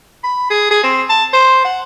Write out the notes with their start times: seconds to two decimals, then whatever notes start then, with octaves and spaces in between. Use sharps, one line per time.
0.24 B5
0.50 G#4
0.71 G#4
0.84 C4
1.10 A5
1.33 C5
1.64 F#5